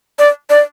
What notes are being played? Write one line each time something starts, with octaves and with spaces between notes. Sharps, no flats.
D5
D5